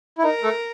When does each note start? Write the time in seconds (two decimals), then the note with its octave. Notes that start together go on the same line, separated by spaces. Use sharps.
0.18 E4
0.23 D#4 A#4
0.43 A3 A4